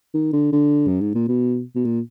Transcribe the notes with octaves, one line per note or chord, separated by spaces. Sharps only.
D#3
D3
D3
F#2
G#2
A#2
B2
B2
A#2